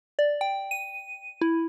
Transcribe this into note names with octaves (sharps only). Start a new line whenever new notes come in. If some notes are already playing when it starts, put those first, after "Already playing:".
D5
G5
D#7
E4